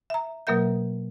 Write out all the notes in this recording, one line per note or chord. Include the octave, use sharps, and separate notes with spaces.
E5 A#5
B2 F#3 A#3 A#4 E5 G6